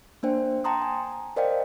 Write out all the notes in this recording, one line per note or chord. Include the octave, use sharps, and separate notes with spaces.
A#3 D4 C5 G5
G5 A5 A#5 C6 D#6
G#5
A#4 C5 D5 D#5 F5 G5